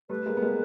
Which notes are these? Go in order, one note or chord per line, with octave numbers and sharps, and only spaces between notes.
G3 A3 B4
G#3 A#3
B3
G#3 A#3